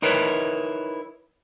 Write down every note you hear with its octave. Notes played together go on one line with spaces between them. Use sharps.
D#4 E4 A#4 B4 C#5